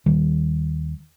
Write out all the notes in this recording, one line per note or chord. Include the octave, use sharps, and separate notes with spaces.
D#2 D#3 G3